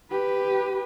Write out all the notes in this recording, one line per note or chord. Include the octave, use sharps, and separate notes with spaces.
G4 B4